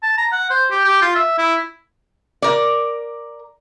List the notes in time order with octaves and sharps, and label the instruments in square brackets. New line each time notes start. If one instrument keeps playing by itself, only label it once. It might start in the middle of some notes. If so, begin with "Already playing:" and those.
[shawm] A5
A#5
F#5
C5
G4
G4
F4
E5
E4
[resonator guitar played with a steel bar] A#4 D5